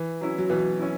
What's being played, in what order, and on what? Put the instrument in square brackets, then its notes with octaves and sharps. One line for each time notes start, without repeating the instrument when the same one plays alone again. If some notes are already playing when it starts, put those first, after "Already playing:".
Already playing: [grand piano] E3
[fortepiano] F#3 C#4 E4
[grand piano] F#3
[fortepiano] B2 [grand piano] E3
[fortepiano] C#4 E4